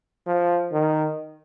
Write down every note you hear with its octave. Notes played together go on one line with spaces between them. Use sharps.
F3
D#3